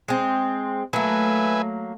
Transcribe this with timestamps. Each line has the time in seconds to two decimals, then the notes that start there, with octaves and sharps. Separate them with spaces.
0.08 G#3 C4
0.93 F#3 A3 A#3 B4 E5 G#5